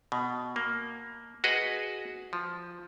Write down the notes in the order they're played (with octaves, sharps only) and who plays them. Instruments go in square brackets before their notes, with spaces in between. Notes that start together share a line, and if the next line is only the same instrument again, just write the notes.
[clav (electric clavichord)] B2
A#3
F#4 G#4 B4 D#5
F3